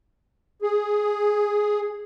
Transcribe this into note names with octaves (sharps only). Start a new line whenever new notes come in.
G#4